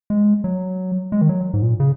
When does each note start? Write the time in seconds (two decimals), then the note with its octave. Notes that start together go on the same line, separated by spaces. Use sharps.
0.10 G#3
0.44 F#3
1.12 G#3
1.21 D#3
1.29 F#3
1.54 G#2
1.62 A#2
1.80 C#3